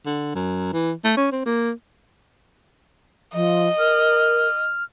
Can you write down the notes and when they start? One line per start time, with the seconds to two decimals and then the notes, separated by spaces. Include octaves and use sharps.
0.06 D3
0.35 F#2
0.73 E3
1.05 A3
1.17 C#4
1.32 C4
1.46 A#3
3.34 F3 D#5
3.79 A#4 F6